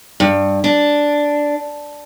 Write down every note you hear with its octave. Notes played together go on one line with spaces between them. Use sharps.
G2
D4